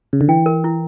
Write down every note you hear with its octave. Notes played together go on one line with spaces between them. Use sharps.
C#3
D3
E3 G5
A#4
E4